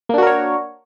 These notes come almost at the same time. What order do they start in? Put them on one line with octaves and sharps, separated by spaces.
A#3 D4 F#4 A#4 C#5